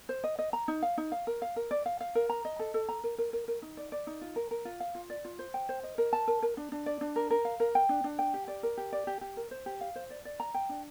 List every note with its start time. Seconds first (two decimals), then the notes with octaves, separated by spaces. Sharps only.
0.09 C5
0.24 D#5
0.39 D#5
0.53 A#5
0.68 D#4
0.82 F5
0.98 D#4
1.12 F5
1.27 A#4
1.42 F5
1.56 A#4
1.71 D5
1.86 F5
2.01 F5
2.15 A#4
2.30 A#5
2.45 D#5
2.59 A4
2.74 A4
2.89 A#5
3.04 A#4
3.18 A#4
3.33 A#4
3.48 A#4
3.62 D#4
3.77 D5
3.92 D5
4.07 D#4
4.21 F4
4.36 A#4
4.51 A#4
4.65 F4
4.80 F5
4.95 F4
5.10 D5
5.25 F4
5.39 C5
5.54 G5
5.69 C5
5.83 D#5
5.98 A#4
6.13 A5
6.28 A#4
6.43 A#4
6.57 D4
6.72 D4
6.86 D5
7.01 D4
7.16 A#4
7.31 A#4
7.45 F5
7.60 A#4
7.75 G5
7.89 D4
8.04 D4
8.19 G5
8.34 G4
8.48 D5
8.63 A#4
8.77 G4
8.93 D5
9.07 G4
9.21 G4
9.37 A#4
9.51 C5
9.66 G4
9.81 F5
9.96 C5
10.10 D5
10.25 D5
10.40 A#5
10.54 G5
10.69 D4